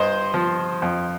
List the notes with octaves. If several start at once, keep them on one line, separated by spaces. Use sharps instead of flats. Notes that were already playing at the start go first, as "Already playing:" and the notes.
Already playing: G2 C5 D#5
F3
F2